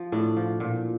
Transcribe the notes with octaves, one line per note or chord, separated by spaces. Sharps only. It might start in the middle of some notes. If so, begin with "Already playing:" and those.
Already playing: F3
A2 D4
F3
A#2